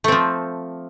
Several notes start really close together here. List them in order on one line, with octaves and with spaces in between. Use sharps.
A3 C4 F3